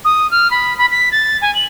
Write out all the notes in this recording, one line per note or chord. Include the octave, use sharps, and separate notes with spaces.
D#6
F6
B5
B5
B6
A6
G#5
F#7